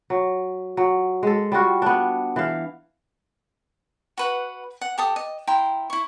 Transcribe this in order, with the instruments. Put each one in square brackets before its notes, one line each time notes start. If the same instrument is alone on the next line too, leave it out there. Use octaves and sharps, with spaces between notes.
[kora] F#3
F#3
G#3 A4
G3 F4 F#4
B3 D4
E3 F5
[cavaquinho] F#4 B4 F#5
F#5
G4 A4 D#6
D#5
E4 G5 A#5 C6
E4 C#6